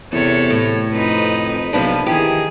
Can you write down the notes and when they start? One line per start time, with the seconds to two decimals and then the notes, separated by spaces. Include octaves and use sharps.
0.12 E2 C3 A4 C#5
0.50 A2
0.93 F2 C4 D#4 B4
1.73 B1 C3 F3 A#3 D4 B4
2.07 D#3 E3 G4 G#4